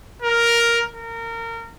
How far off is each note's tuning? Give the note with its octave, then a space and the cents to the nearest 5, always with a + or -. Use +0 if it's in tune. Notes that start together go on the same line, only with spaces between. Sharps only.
A#4 +5
A#4 -25